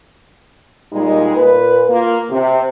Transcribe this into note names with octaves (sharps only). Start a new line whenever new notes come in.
A#2 G3 G#3 D#4
A#2 B4
A#3 F4
C3